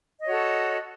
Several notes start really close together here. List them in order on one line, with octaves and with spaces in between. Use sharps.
D#5 C#5 F#4 A4